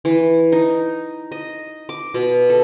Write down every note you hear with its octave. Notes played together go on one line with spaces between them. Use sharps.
E3
D#4
D#5
D6
B2
A4